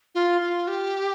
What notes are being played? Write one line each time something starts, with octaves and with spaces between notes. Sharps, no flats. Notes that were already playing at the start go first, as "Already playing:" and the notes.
F4
F4
G4